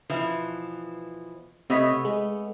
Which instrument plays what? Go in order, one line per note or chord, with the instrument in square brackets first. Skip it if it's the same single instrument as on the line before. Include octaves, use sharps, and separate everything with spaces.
[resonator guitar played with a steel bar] B2 E3 F3
[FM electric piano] C3 D#5 B6 [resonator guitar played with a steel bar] A3 B3 C#5
[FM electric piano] G#3